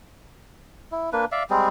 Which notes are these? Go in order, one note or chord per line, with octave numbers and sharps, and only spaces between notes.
E4
A#3 D4 B4
D5 E5 F5
G3 G#3 C4 G#4